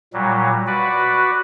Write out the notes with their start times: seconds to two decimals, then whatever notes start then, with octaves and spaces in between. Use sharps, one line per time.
0.13 A#2 F#3 G3
0.67 F#4 B4 D5